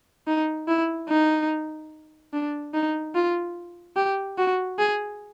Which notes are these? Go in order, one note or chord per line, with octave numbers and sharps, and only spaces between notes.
D#4
E4
D#4
D4
D#4
F4
G4
F#4
G#4